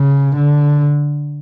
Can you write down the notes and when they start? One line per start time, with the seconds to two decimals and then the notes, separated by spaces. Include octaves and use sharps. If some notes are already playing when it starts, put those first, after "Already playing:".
Already playing: C#3
0.36 D3